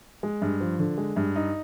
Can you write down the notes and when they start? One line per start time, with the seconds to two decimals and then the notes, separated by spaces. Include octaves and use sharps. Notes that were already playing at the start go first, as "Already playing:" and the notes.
0.23 G#3
0.42 G2
0.60 F3
0.79 D3
0.98 G#3
1.16 G2
1.36 D#4